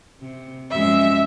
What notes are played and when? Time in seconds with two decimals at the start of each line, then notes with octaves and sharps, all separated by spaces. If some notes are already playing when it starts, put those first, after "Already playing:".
0.21 C3
0.71 F#2 F3 G#3 E5